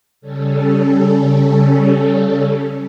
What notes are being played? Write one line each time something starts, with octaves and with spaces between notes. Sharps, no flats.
C#3 G3 C#4 A4